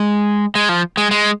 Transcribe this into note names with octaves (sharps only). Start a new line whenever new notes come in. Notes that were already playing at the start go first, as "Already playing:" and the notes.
Already playing: G#3
G#3
F3
G#3
G#3